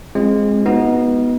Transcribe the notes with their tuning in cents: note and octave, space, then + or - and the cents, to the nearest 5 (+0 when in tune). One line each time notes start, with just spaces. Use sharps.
G#3 +0 C4 +25 F4 +0
B3 -10 D#4 +25 F#4 +0